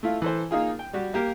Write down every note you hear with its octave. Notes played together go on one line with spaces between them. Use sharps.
A3 E4 F4
E3 A4 C5
A#3 D#4 F4 G#4
G5
G3 F#4 G4
A#3 G4 A#4